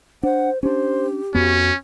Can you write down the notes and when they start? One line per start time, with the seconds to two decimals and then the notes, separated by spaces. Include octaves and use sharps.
0.23 D4 C5 F#5
0.63 C#4 D4 G4 C5
1.35 F2 B3 C#4 F#4